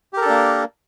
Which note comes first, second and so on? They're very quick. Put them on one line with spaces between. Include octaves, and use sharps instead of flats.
G4 A#4 A4 D4 A#3